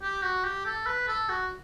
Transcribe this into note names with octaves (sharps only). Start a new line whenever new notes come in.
G4
F#4
G4
A4
B4
A4
F#4